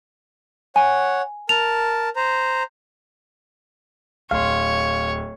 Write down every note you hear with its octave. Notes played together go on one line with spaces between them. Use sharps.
C#5 F#5 G#5
A#4 A5 F7
C5 A#5
D1 C#5 F5 C6